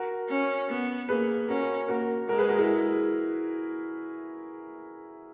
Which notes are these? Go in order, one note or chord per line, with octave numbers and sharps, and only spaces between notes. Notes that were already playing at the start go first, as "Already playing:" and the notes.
Already playing: F#4 A#4
C#4
B3
A#3 G#4 B4
C#4 F#4 A#4
A#3 F#4 A#4
G#3 F#4 A#4
G#4 B4
F#4 A#4
E4 G#4